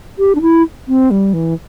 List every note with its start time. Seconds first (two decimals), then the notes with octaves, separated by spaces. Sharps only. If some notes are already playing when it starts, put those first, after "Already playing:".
0.19 G4
0.35 D4
0.42 E4
0.87 C4
1.10 G3
1.33 E3